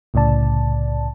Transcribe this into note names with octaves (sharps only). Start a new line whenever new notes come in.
C2 A2 C#3 D5 A5